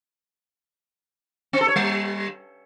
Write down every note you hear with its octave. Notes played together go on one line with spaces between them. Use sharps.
C4
A4
C#5
G3